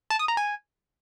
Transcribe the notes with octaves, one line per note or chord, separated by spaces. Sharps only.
A5
D#6
A#5
G#5